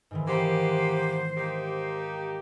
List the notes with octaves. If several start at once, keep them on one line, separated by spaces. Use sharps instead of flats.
G#2 D#3 E3
A#3 B3 G4 C5
A#3 D#4 G4